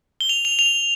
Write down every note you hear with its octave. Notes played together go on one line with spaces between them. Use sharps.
G7
F7
F7
F7